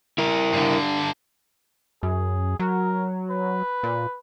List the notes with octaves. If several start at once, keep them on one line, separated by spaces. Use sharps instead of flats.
E4 A#4
G2 D3
F#2 G#4
F#3 A#4
B4
A#2